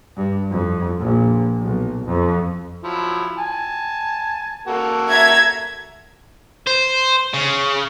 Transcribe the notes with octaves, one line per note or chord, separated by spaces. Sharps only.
G2
F2
A#1
B1
F2
F3 F#3 E4
G#5 A5
A#3 F#4 A4
E5 A#5 G#6
C5
C#3